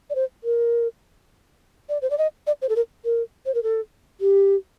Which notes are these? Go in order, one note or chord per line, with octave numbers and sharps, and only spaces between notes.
D5
C5
A#4
D5
C5
D5
D#5
D5
C5
A4
A#4
A#4
C5
A#4
A4
G4